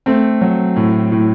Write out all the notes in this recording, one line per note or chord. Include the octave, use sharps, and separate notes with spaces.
A3 C4
F#3
A2
A2